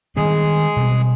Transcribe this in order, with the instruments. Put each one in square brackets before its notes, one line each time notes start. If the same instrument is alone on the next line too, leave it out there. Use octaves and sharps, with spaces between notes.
[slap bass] D#3 G3 B3 D4 [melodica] G#3 G#4
[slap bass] B2 G3 C4